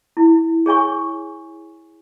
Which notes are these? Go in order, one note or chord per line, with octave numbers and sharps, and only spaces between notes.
E4
G#4 C#5 G#5 C#6